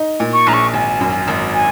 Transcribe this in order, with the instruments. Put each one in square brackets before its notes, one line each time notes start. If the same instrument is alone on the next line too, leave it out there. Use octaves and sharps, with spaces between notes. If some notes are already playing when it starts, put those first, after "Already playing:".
Already playing: [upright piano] D#4
A#2
[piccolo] C#6
[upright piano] A#1 [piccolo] A#5
[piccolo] C#6
[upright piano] G#1 [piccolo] G#5
[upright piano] F#2
G#1
[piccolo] G#5